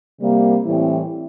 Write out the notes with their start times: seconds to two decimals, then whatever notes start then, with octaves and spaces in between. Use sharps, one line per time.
0.20 C3 G3 A#3
0.65 A2 E3 G3 C4 E4